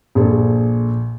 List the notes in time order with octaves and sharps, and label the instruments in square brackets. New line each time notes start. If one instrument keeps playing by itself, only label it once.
[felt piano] A#1 G#4 A4